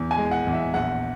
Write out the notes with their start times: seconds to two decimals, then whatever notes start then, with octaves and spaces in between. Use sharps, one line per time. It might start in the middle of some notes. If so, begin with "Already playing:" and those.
Already playing: E2
0.11 G#5
0.17 G#3
0.31 F#5
0.47 E2
0.53 E5
0.74 A#1 F#5